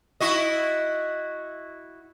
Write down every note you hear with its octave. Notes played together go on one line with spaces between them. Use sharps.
E4 F#4 D#5